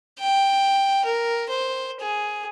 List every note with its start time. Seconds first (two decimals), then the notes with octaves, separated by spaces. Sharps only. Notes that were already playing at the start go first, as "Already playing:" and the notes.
0.19 G5
1.04 A#4
1.49 C5
2.00 G#4